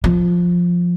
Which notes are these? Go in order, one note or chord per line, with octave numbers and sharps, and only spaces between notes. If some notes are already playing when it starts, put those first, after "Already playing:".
F3